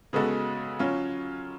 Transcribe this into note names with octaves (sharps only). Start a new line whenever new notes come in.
C#3 G#3 B3 F#4 A4
F#3 C#4 F4